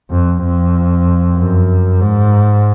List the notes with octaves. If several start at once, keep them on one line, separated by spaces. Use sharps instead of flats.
F2
F2
F#2
G#2